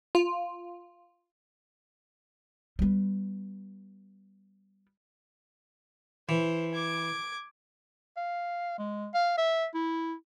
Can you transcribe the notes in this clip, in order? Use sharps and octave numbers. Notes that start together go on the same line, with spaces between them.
F4
G3 B3
E3 C5
D6 G#6
F5
G#3
F5
E5
E4